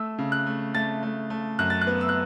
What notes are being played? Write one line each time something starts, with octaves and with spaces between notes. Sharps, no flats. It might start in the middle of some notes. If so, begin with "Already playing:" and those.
Already playing: A3 E6
C#3
F#6
A3
A3 A6
A3
A3
F#2 F#6
A6
F#6
B3
E6
F#6